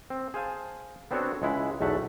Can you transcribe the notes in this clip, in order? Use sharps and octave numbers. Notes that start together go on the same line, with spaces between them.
C4
G#4 C5 F5 G#5 A5
B3 C4 D4 F#4 A4 C#5
C#2 G#3 E4 F#5
B1 E2 A3 E5 F#5 A5